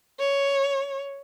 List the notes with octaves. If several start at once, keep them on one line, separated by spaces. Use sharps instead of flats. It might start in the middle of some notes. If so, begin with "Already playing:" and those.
C#5